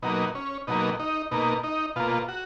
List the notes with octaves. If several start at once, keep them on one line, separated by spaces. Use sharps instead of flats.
B2 F#3 A#3 D#4
C#4
B2 F#3 A#3 D#4
D#4
B2 A#3 D#4
D#4
B2 A#3 F4
F#4